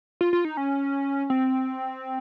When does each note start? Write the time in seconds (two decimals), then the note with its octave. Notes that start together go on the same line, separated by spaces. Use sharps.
0.21 F4
0.33 F4
0.45 D#4
0.57 C#4
1.30 C4